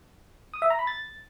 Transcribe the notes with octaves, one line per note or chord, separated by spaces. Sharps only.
D#6
E5
A#5
B5
A6